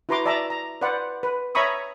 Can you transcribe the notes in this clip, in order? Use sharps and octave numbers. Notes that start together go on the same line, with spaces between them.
E4 F#4 B4 A#5 C6 D6
D5 E5 A5 A#5 D6
A#5
B4 C5 D5 F#5
B4
C#5 E5 A#5 B5 C#6 D#6